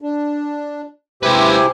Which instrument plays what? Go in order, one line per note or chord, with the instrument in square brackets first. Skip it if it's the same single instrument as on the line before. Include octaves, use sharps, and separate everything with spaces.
[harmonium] D4
[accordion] C3 E4 G4 [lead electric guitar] G#3 B4 [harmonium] C5 G#5